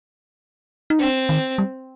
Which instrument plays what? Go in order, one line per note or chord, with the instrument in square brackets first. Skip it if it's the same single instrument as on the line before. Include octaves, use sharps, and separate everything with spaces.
[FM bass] D#4
[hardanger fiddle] C4 [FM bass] D4
[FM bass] D#3
G3